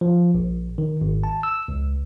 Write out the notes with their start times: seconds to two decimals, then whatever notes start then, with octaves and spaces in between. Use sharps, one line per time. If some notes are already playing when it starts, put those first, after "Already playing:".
0.01 F3
0.34 A#1
0.78 D#3
1.01 G#1
1.23 A5
1.43 E6
1.68 C#2